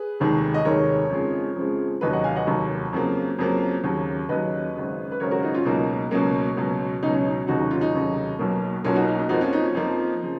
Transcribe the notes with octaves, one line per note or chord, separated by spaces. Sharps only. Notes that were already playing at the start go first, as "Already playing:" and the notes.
Already playing: G#4 B4
F1 D#2 D#3 G#3
D#5
F1 D#2 D#3 G#3 A#4 C#5
F2 C#3 F3 G#3
F2 C#3 F3 G#3
F1 D#2 D#3 F#3 B4 D#5
D#5 F#5
F5 G#5
D#5 F#5
F1 D#2 D#3 F#3
F2 C#3 F#3 A#3
F2 C#3 F#3 A#3
D#2 C#3 F#3
D#2 C#3 F#3 B4 D#5
G#1 F#2 C#3
B4
G#1 F#2 C#3 A#4 C#5
F#4 A#4
D#4 F#4
C#4 F4
C#2 B2 F#3 A#3 D#4
C#2 B2 F#3 A#3 C#4
C#2 B2 F#3
C#2 B2 F#3 D#4
C#4
D#4
F1 D#2 C#3 F#3 D#4 F#4
D#4 F#4
C#4 F4
D#4
F1 D#2 C#3 F#3
B1 B2 F#3 A#3
B1 B2 F#3 A#3 C#4 F4
D#4 F#4
D#4
D#4
F2 F3 A#3 D#4 F#4
C#4 F4
D#4
C#4
F2 F3 A#3 D#4
C#3 F3